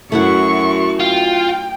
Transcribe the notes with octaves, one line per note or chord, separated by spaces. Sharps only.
F#2 A3 E4 F#4 F#5 C#6
F4 G5